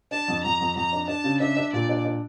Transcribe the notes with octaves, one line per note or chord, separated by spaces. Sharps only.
D4 A5
F2
F2 A#5
F2
F2 A#5
D4
D4 A5
C#3
D4 E5
D4
A#2 D5
D4
D4